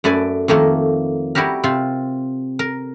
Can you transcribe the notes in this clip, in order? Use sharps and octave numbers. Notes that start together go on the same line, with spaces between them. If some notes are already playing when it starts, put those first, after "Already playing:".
F#2 A3 B4 D5 G#5
F2 D#3 A3 A#3
G3 E4 F#4 G4 A#4
C3 C4 F4
A#4